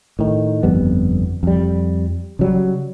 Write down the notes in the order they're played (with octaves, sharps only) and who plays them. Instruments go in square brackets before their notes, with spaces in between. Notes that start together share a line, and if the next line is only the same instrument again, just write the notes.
[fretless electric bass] A2 D#3
G1 F2 G3 B3
F2 G3
C#3 F#3 G3